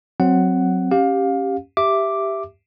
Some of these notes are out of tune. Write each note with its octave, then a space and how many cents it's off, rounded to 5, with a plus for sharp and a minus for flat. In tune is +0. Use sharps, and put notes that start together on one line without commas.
F#3 +0 C4 +0 F#5 +5
C#4 -15 G4 +0 F5 +25
G4 +0 E5 +5 D6 +0